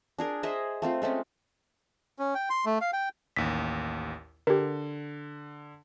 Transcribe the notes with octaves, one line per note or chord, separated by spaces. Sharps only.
D4 G#4 A#4
G#4 C5 D#5 E5
A3 C4 F4
G#3 A3 C4 C#4
C#4
G5
C6
A3
F5
G5
A1 D#2 B6
D3 G4 A#4